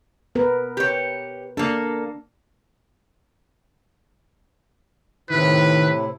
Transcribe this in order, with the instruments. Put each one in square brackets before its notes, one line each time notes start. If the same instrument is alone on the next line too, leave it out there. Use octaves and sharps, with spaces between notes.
[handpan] B3 A#4 B4
[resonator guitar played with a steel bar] G4 C#5
[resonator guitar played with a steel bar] A#3 A4 [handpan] D4
[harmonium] A2 C3 E4 [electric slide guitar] D#3 [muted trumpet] B4